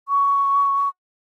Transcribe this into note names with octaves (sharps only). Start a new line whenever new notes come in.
C#6